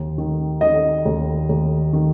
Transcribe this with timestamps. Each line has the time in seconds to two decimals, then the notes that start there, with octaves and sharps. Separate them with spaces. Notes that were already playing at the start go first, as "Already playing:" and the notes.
Already playing: D#2
0.18 D#3
0.61 D#3 D#5
1.05 D#2
1.49 D#2
1.93 D#3